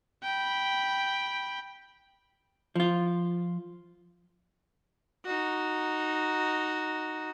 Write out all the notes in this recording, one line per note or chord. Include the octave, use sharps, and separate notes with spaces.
G5 B5
F3 F4
D#4 F#4